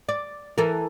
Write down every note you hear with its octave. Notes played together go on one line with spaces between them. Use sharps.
D5
E3 A4 A#4